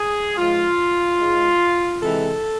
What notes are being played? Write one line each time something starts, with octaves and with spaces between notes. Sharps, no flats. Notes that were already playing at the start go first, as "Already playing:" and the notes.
Already playing: G#4
G#2 F3 G#3 F4
G#2 G#3
C3 E3 G#3 A4